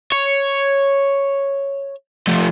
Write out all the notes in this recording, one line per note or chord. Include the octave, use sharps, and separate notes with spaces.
C#5
F3 A3